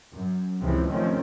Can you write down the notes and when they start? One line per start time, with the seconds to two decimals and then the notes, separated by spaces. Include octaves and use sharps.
0.13 F#2
0.60 C#2 F#2 C3 E3 F3 C4
0.90 C3 D#3 F3 A3 C4 C#4